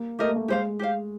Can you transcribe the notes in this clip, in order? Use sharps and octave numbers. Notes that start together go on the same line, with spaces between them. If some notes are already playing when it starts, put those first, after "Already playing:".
Already playing: A#3
A3 G4 A#4 D#5
A#3
A3
G#3 G4 C5 F5
G4 C5 F5